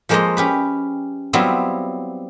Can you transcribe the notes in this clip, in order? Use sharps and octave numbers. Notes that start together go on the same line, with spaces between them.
F3 G#3 A#3 C5 C#5 D#5
C#4 G4 B4
F#3 G3 B3 C4 E4 F4